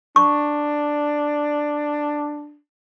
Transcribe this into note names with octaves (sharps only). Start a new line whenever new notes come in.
D4 C#6